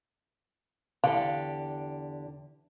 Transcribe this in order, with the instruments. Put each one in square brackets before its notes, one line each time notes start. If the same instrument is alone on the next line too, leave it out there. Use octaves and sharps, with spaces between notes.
[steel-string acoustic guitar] E2 D3 G4 [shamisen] F5